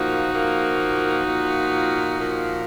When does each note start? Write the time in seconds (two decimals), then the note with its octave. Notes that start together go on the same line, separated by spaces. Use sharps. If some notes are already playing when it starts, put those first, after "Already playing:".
Already playing: A#2 F3 A#3 D#4 F#4
0.34 A#2 F3 A#3
1.27 A#2 F3 A#3
2.20 A#2 F3 A#3